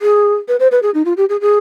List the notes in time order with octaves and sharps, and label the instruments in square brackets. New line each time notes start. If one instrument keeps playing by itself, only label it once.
[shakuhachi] G#4
B4
C5
B4
G#4
D#4
F4
G4
G#4
G#4